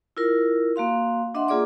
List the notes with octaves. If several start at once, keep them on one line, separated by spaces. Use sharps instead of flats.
E4 F4 A#4
A#3 F#4 F5 C6
D4 D#5 E5 F#5 C6
A#3 F4 G#4 D5 D6